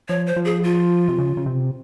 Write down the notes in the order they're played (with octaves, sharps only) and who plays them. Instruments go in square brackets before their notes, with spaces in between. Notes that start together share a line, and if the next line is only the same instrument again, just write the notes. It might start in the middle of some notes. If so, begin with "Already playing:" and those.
[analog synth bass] F3 [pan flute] C#5
[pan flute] C5
[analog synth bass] F3
[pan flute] G#4
F4
[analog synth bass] C3
C#3
C#3
C3